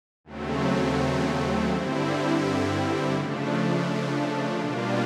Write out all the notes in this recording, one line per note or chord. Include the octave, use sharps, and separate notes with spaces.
D#2 C#3 F#3 A3 C4
G2 D3 G3 C4 E4
C#3 F3 A3 D4
B2 G3 A#3 D4 F4